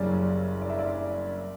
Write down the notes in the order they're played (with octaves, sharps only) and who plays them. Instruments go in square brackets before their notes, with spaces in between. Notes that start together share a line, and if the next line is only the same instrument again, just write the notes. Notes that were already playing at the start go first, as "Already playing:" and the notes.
Already playing: [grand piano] F#1 F#2 C#3 G3 C#4 [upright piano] D5
[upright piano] D5
E5
D5